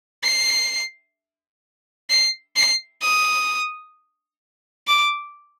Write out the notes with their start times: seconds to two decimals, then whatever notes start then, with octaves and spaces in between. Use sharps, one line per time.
0.23 C7
2.10 C7
2.56 C7
3.02 D#6
4.87 D6